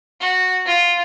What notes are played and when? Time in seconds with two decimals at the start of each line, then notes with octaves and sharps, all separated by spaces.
0.20 F#4
0.66 F4